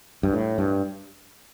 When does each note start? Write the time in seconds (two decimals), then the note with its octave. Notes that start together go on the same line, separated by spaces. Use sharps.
0.23 G2
0.33 A2
0.58 G2